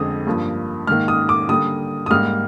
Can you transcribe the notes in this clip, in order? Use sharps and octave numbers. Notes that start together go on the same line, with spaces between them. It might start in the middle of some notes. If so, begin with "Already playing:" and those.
Already playing: F2 D3 G#3 C4 D#6
G2 F3 A#3
G#2 D#3 A#3 F6
D#6
D6
D3 G3 A#3 D#6
D#6
G#2 G3 A#3 F6